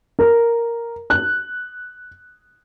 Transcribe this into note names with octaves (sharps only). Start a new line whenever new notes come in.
A#4
F#6